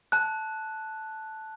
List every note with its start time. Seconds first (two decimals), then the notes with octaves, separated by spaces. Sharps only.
0.12 A5 F#6